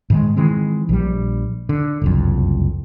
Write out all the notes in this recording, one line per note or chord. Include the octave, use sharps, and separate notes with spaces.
G#2 D#3 G#3
D#3 E3 G#3 C4
A#1 G3
D3
F#1 C2 F2